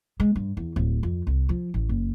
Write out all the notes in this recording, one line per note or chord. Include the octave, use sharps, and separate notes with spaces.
G#3
G2
E2
D1
F2
C2
F3
A1
F#1